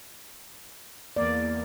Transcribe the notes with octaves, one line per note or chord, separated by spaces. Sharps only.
E2 A#3 D5